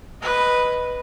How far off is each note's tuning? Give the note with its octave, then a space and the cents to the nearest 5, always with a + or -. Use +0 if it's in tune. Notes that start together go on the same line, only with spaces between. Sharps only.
B4 +0 D#5 +0